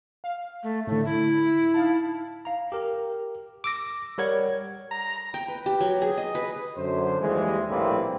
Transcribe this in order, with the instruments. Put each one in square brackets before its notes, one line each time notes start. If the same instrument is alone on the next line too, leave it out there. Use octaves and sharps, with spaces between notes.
[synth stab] F5
[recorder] A3
[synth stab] A2 D3 [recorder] A3
[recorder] E4
[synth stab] D#4 F5 A5
[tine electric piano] F5 A#5
G4 A#4
D6 E6 A#6
G3 A#4 C#5 F#5 G#6
[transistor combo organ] A#5
[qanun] G5
B4
G4
F#3
G#4
D#5
B4
[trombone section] F#2 D3 C5
D#2 E3 G3 G#3
A#1 A2 G3 A#3 C4 B4